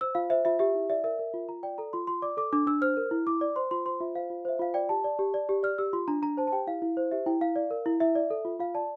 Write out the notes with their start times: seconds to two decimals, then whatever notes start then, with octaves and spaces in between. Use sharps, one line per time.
0.01 C5 E6
0.15 F4 F5
0.30 C5 E5
0.45 F4 E5
0.59 G4 E5
0.75 E4
0.90 D5 E5
1.04 A#4 E5
1.19 A#4
1.34 F4
1.49 F4 A#5
1.63 D5 G5
1.78 A4 A#5
1.93 F4 C6
2.07 F4 C6
2.22 D5 D6
2.37 A4 D6
2.53 D4 D6
2.67 D4 E6
2.82 C5 F6
2.97 A#4
3.11 E4
3.27 E4 D6
3.41 D5
3.56 C5 C6
3.71 F4 C6
3.86 C5 C6
4.00 F4 E5
4.15 C5 F5
4.30 F4
4.45 C5 E5
4.59 F4 F5
4.74 D5 G5
4.89 G4 A5
5.04 D5
5.19 G4
5.34 D5
5.49 G4
5.63 D5 F6
5.78 G4 E6
5.93 F4 C6
6.08 D4 A#5
6.22 D4 A#5
6.37 C5 A5
6.47 A5
6.52 G4 G5
6.67 E4 F5
6.82 E4
6.97 C5
7.11 G4 E5
7.26 E4 G5
7.41 E4 F5
7.56 D5
7.71 A#4
7.86 E4
8.00 E4 E5
8.15 D5
8.30 A4
8.45 F4
8.59 F4 F5
8.75 D5 A5